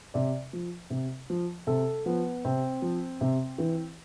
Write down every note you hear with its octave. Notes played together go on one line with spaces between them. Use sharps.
C3 D5
F3
C3
F3
C3 A4
F3 B3
C3 C4
F3
C3
E3